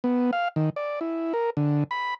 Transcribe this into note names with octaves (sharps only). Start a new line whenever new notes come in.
B3
F5
D#3
D5
E4
A#4
D3
B5